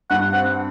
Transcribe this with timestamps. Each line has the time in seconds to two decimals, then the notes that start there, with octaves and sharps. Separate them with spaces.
0.10 G2 F#5
0.33 C4 F#5